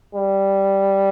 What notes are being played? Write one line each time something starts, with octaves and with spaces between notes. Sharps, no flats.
G3